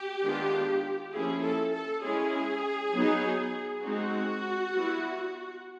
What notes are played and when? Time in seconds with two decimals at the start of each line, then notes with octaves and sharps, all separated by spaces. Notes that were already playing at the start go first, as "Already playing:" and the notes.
Already playing: G4
0.23 D#3 G#3 B3 D4 F4
1.12 F3 A#3 C#4 E4 G#4
1.43 A4
1.73 A4
2.03 G#3 C#4 E4 G#4
2.93 F#3 B3 D#4
3.82 G#3 C4 D#4 F#4
4.73 G3 B3 E4